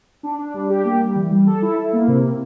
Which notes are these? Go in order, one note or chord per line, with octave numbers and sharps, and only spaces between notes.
D4
D4
G3
G4
A#3
G3
E3
G3
A4
E4
E4
A#3
C3
C3